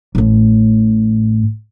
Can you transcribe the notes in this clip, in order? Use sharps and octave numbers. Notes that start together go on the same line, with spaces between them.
A1 A2